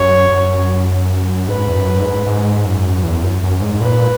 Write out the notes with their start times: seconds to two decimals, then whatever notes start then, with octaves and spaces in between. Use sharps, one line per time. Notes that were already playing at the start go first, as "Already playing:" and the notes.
Already playing: F#2 C#5
0.32 F#2
1.48 G#2 B4
1.68 E2
1.74 F#2
2.00 G#2
2.26 G#2
2.65 F#2
3.04 E2
3.23 F#2
3.43 F#2
3.61 G#2
3.81 A#2 B4